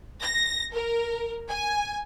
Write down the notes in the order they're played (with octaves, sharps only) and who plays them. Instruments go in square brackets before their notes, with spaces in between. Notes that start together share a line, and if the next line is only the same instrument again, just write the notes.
[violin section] A#6
A#4
G#5